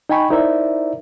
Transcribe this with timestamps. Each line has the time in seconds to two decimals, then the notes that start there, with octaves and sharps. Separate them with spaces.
0.09 D#4 D#5 G5 G#5 B5 C#6
0.30 D#4 E4 A#4 C5 D5 E5